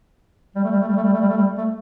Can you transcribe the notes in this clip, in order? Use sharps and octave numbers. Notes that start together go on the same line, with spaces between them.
G3
A3
G3
A3
G3
A3
G3
A3
G3
A3
G3
A3